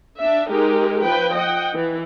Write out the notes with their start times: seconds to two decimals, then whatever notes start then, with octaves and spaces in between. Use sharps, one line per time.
0.19 D4 E5
0.50 G#3 D#4 G4 A#4
1.04 F3 B4 G5
1.35 D#5 F#5 G5
1.74 E3